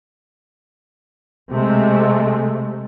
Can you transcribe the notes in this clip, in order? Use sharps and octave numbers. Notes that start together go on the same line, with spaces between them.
C3 G#3 A3